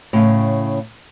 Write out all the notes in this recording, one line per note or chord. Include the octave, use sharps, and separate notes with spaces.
A2 C#3